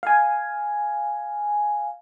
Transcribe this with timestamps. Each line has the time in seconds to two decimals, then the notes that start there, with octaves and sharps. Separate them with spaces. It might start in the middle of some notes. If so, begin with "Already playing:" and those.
0.03 F5 G#5